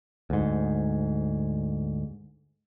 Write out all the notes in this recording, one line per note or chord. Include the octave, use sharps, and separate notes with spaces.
D2 G#2